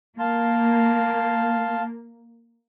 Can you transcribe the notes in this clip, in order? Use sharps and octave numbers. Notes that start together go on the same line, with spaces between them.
A#3 F5 A5 C6